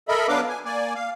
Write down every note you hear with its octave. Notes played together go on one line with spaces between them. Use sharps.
A4 A#4 D#5 E5 B5
F#3 B3 D4 B4 F5 D6
G#5
A#3 D5 G#5
F5